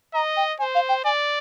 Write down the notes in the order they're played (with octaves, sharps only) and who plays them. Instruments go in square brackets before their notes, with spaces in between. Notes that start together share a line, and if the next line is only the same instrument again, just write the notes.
[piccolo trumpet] D#5 [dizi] A#5
[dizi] G5
[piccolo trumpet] C5 [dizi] G#5
[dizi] F5
G5
[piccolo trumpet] D5 [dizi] G#5